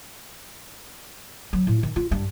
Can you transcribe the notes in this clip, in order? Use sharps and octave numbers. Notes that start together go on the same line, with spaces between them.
F#3
A2
D#3
F4
G2